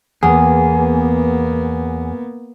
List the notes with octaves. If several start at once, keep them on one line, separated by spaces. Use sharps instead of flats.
E2 A#3 B3 G#4